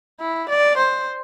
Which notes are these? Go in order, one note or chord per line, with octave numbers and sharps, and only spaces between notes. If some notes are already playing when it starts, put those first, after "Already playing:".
E4
D5
C5